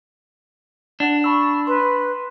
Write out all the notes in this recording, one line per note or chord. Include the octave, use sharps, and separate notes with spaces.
D4 F#5
A5 B5 C#6 E6
B4 C6